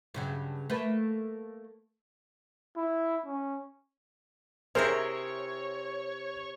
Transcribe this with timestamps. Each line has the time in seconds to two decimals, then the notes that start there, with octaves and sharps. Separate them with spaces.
0.14 G2 C#3 F#3
0.70 A3 A#3 B4
2.76 E4
3.26 C#4
4.75 C3 C4 E4 G#4 A#4 C5 C#5